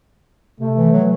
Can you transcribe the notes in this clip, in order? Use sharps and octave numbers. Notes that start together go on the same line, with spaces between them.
C3 A3
E3
F#3